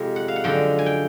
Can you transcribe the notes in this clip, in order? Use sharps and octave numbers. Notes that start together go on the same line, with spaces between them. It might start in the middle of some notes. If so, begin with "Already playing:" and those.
Already playing: F2 C3 F3 G#3
F#5
F5
F#5
F#2 D3 F3 G#3 G5
G#5
G5